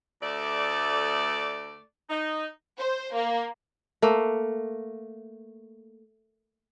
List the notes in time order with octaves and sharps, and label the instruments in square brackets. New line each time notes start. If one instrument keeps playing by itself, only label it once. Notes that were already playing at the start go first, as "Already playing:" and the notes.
[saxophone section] D2 A3 D5
D#4
[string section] C5
A#3
[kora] A3 A#3